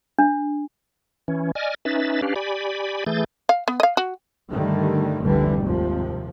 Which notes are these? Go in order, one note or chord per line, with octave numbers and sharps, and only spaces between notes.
D4
E3 C#4
D5 D#5 G#5 F6
C#4 D#4 B4 E5 A6
C#4 D4 G4 B4 F5
G4 D5 G#5 B5
E3 A3 G#4 G6 A6
F5
B3
D#5 F5
F#4
G2 D3 D#3 G3 A3
F1 C#2 D3 E3 G3
D#2 G#2 C3 F3